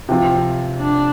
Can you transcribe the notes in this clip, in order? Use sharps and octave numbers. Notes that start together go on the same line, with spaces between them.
C3 F3 C4 F4
D4